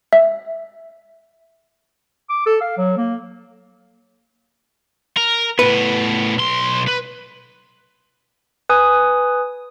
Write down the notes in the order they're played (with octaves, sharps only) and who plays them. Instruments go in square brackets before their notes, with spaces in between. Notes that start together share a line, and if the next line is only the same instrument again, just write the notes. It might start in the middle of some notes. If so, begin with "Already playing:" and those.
[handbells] E5
[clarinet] D6
A4
F5
F#3
A#3
[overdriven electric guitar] A#4
[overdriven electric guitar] A2 B3 [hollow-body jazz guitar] B4
[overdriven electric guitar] B1 C6
B4
[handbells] B4 G#5 D#6